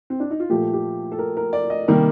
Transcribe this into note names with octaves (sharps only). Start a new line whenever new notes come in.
C4
D4
D#4
F4
A#2 F3 A3 G4
G4
A4
A#4
A#4
D5
D#5
C3 D#3 G3 A#3 A#4